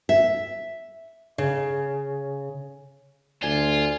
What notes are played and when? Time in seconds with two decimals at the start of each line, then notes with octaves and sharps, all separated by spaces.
0.09 E5
1.38 C#3
3.43 D2 F4 D5 G#5 G#6